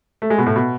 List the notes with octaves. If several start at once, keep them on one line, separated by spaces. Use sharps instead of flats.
A3
G#3
B2
A2
B2